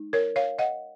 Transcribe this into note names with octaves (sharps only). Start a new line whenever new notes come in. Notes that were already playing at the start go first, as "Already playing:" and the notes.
Already playing: G#3 D#4
A#4 C#5
C#5 F5
D#5 F#5